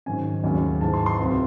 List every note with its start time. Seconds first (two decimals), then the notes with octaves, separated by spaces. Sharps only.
0.06 G#2 D#3 F#3 C#4 G#5
0.44 D#2 C#3 F#3 A3 C#4
0.81 G#2 E3 G#3 A5
0.94 C6
1.06 C6
1.19 C#2 C3 F#3 C4